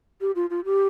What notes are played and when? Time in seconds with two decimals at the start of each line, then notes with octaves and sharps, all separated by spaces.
0.21 G4
0.35 F4
0.50 F4
0.65 G4